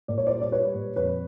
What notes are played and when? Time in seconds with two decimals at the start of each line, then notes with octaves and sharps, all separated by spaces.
0.08 A#2 D5
0.18 C#5
0.27 G3 C5 D5
0.42 D5
0.52 G3 B4 C#5
0.74 A#2
0.96 F2 B4 C#5